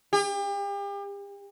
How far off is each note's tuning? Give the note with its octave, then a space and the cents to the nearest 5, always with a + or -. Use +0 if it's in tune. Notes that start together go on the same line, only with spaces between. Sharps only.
G4 +40